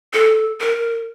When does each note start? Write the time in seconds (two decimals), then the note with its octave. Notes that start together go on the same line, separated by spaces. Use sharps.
0.13 A4
0.61 A#4